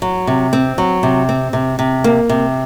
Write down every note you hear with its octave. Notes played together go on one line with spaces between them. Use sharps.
F#3
C3
C4
F#3
C3
C4
C3
C3
A#3
C3